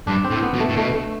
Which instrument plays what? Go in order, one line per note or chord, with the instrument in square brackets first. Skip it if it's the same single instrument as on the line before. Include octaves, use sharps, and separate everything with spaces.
[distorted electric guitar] G2 [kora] D4
[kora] C4
[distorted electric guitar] A2
[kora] B3
[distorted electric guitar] B2
[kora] A3
[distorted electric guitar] A2
[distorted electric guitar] B2 [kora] A3
[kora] A3